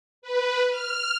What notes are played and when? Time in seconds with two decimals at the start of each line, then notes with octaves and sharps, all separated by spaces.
0.22 B4
0.69 F6